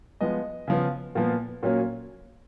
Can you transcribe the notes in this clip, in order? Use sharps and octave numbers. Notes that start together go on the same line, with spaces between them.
F3 G#3 B3 D#5
C#3 F3 B3
A#2 F3 B3
A#2 F#3 A#3 C#4